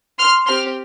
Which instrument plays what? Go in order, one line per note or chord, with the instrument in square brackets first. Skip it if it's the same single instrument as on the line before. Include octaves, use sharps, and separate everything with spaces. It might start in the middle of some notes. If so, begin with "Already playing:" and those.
[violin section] C6 F6
C4 G4 C6 F6